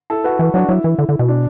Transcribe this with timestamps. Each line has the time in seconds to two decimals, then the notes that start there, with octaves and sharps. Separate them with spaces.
0.10 E4 A4
0.24 F#4 B4
0.39 E3
0.54 F#3 D4 F#4
0.69 F#3 E4
0.84 E3
0.99 D3
1.09 D3
1.19 B2
1.28 D4